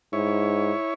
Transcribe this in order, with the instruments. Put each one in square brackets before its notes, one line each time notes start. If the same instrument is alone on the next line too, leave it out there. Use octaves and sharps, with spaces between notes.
[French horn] G#2 [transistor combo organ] E4 C#5